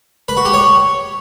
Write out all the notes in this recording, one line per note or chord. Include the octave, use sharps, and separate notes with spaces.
B4
F#4
G4
C#5